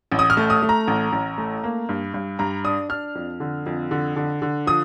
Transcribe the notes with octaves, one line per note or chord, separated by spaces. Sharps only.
A1
D#6
F6
A3
D#6
A3
A#5
A1
A1
A3
A#3
G2
G2
G2 A#5
D4 D#6
D4 F6
F2
D3
F2
D3
D3
D3
F3 D#6